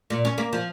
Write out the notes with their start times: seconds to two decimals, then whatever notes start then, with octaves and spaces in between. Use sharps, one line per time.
0.10 A#2
0.25 C#4
0.38 A#3
0.53 F3